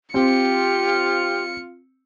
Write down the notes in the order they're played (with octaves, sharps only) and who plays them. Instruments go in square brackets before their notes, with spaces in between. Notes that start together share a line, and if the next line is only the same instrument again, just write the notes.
[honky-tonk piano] C4 [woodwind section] F4 [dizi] G4 [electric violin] C#7